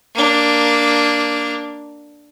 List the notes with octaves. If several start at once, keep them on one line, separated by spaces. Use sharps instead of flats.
A#3 D4